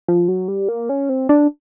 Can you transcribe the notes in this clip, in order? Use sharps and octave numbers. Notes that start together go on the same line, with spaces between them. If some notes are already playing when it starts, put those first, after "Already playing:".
F3
F#3
G3
A#3
C#4
C4
D4